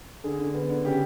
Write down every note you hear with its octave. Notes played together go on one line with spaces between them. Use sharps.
D3 G#4
D3
B3
D3
C#3 G4